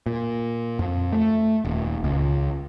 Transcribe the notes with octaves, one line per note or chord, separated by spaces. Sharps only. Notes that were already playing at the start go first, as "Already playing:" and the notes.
A#2
F2
A3
D#1
C#2